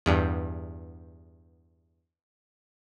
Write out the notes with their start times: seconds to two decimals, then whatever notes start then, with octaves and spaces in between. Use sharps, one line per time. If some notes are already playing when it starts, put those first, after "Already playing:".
0.06 E2 G2